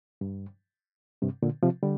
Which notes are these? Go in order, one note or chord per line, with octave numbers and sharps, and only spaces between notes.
G2
G2 C3
A#2 D3
C3 F3
D3 G3